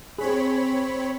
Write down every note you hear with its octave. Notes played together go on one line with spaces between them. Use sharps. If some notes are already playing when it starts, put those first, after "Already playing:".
C4 G#4 C#5 B5